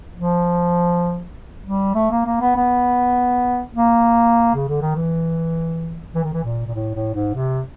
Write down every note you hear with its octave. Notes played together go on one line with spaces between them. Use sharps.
F3
G3
A3
A#3
A#3
B3
B3
A#3
C#3
D3
D#3
E3
E3
D#3
E3
A#2
A#2
A2
A2
G#2
C3